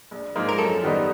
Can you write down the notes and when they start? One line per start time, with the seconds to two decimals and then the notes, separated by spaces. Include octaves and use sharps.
0.11 A#1
0.35 G#2 F3 A#3 D#4
0.49 A#4
0.58 F#2 A4
0.83 D#3 G3 B3 D#4